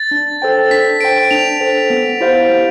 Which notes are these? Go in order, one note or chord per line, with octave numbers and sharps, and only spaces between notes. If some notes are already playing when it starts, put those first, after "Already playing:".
Already playing: A6
D4
A4 C5 G5
D4 B6
A4 C5 G5 D7
D4 F7
A4 C5 G5
B3
E4 G4 C5 F5
B3